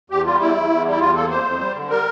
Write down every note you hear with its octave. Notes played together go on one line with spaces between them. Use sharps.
E2 G4
G3 F4
E2 E4
E2
E2
G3 E4
E2 F4
A#3 A4
F2 C5
F2
G3
D3
G3 A#4